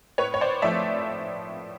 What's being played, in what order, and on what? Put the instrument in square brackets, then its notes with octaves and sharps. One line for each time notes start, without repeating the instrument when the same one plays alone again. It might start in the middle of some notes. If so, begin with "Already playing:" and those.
[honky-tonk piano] A2 B4 C#5
C#5
C5 D5
F3 A3 D5 E5